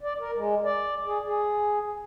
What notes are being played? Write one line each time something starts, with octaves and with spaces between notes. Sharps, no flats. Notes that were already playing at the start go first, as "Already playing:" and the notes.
D5
A#4
G#3
D5
G#4
G#4